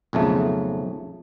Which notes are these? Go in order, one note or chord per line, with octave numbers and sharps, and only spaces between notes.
B1 F2 C#3 A3